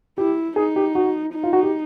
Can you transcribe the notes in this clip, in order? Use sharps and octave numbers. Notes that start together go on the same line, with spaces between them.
E4 G4
D#4 G#4
G4
F#4
D#4
F4
F#4
G4